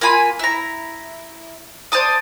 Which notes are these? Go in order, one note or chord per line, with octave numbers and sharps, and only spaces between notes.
A#3 F4 G#5 B5
E4 A#5
C5 D5 A5 D#6